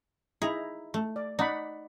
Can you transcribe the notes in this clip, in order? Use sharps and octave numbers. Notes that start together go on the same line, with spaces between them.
D#4 E4 G#4 A#5
A3
D5
D#4 D5 F#5 B5